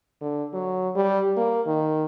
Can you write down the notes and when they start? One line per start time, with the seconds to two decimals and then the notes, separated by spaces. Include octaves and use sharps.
0.21 D3
0.54 F#3
0.96 G3
1.37 A#3
1.67 D#3